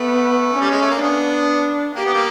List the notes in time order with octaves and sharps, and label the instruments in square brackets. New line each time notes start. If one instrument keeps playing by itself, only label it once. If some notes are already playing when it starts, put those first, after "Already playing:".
Already playing: [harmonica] A3 [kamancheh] B3
[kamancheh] C#4
[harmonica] G3
G#3
A3
A#3
[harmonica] B3 [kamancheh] D4
[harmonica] A#3 [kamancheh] G4
[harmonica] B3
G3 A#3